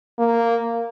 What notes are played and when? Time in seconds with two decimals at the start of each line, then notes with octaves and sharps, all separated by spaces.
0.19 A#3